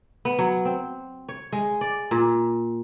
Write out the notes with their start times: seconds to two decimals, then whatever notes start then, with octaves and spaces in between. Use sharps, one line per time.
0.25 B3
0.39 F#3
0.65 C4
1.29 C#5
1.52 G#3
1.81 D5
2.11 A#2